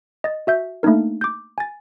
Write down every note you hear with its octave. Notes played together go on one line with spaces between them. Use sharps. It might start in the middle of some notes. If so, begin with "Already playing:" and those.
D#5 A6
F#4 E5 G6
A3 A#3 D4 D#4 A#4
D6 G6
G#5 A6